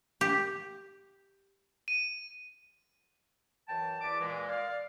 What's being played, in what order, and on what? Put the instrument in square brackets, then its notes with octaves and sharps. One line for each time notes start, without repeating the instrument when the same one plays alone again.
[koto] G4
[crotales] D#7
[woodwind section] F#2 E3 G5 A5
E2 B4 D5 D6
A#2 E3 G#3
D5 F5